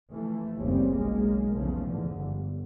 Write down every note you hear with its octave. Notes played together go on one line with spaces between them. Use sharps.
E3 F3 A3
F#1 D#2 C#3 G3 C4
B1 G#3 A#3
B1 E2 C#3 F3 A3
E2 G#2 D3
G1